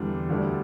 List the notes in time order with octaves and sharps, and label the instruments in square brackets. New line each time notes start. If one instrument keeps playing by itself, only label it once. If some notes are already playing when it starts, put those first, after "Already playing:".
Already playing: [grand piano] E2 D3 G3
D2 D3 G3